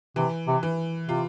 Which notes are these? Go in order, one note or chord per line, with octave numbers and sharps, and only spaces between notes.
C3 E3
C3
E3
C3 F4